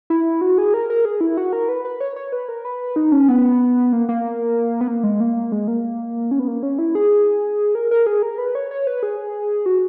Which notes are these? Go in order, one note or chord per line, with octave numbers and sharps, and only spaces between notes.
E4
F#4
G#4
A#4
A#4
G#4
E4
F#4
A#4
B4
B4
C#5
C#5
B4
A#4
B4
D#4
C#4
B3
A#3
A#3
B3
A#3
G#3
A#3
G#3
A#3
C#4
B3
A#3
C#4
E4
G#4
A#4
A#4
G#4
A#4
B4
C#5
C#5
B4
G#4
F#4